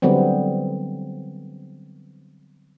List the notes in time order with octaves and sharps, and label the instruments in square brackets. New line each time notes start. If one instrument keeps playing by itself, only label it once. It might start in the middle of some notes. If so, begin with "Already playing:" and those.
[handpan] D3 F#3 G3 B3 C4